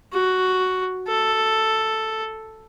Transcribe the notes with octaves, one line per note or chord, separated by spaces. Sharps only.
F#4
A4